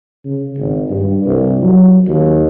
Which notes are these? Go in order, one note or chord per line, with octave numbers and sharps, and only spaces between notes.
C#3
G#1
G2
C2
F#3
D#2